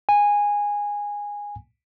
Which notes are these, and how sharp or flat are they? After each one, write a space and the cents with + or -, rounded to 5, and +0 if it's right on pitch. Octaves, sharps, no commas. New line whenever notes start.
G#5 -15